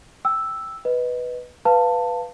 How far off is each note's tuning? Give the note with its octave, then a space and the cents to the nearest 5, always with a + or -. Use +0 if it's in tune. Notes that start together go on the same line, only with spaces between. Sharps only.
G5 +0 E6 +0
B4 +0 D#5 +0
B4 +0 F5 -5 A5 +15